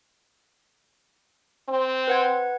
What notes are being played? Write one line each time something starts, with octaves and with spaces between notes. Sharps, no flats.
C4
B4 F#5 G#6